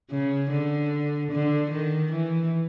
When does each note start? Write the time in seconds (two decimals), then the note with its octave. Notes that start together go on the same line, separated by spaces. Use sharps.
0.11 C#3
0.51 D3
1.31 D3
1.71 D#3
2.12 E3